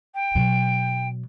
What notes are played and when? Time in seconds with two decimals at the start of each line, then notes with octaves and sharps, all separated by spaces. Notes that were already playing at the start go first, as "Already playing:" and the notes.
0.14 G5
0.35 B2 F#3